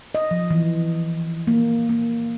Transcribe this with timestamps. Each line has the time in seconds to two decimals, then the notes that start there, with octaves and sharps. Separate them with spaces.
0.15 D#5
0.31 F3
0.51 E3
1.47 A#3
1.89 A#3